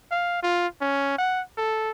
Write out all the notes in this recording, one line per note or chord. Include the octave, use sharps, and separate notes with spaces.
F5
F4
C#4
F#5
A4